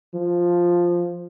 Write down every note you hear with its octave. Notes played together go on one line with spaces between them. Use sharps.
F3